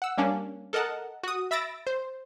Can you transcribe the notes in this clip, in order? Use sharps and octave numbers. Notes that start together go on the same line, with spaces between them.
F#5 E6
G3 A#3 C#4 D4
A4 A#4 D#5 F#5 A5
F#4 D#6
E5 B5 E6 A6 A#6 D7
C5